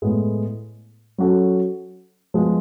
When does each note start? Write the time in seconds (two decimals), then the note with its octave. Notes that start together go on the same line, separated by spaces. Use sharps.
0.02 A2 G#3 B3
1.18 F#3 C#4 F#4 A4
2.34 F3 G#3 B3